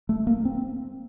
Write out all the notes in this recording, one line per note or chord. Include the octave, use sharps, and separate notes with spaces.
A3
A#3
C4